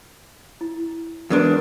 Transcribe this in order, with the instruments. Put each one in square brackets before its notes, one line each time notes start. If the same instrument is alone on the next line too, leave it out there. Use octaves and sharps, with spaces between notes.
[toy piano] E4
[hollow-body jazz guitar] E2 G#2 D4 [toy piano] F#4 A#4 B4